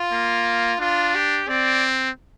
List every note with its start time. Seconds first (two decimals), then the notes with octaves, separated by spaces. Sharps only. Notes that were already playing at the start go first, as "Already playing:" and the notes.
Already playing: F4
0.12 A#3
0.80 D4 F4
1.15 G4
1.48 C4 D5